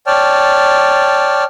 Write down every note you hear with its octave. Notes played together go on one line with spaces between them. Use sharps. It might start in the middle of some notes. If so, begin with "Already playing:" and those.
C#5 D5 G5 A5 F6